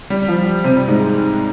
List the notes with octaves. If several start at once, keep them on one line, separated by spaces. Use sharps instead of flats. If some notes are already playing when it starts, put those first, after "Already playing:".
G3
F3
C3 C4
G3
G#2 G#3